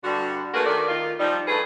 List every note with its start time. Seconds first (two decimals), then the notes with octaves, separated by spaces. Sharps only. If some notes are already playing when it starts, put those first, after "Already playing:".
0.04 G2 D3 G3 F#4
0.54 A3 A#3 F#4 G#4 A#4 B4
0.66 D#3 A3 D5
0.89 D#3 F4
1.20 F3 G3 D#4
1.48 G2 A3 G#4 B4